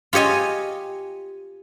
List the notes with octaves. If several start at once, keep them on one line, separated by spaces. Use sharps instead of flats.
F4 G4 C#5 D#5 G#5